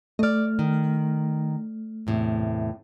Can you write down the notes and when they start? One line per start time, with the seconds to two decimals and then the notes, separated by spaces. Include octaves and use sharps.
0.19 A3 D5 D#5 F6
0.59 D#3
2.07 E2 A2 C3